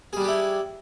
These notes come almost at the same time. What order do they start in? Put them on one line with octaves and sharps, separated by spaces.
G#4 G3 D4 G4 E4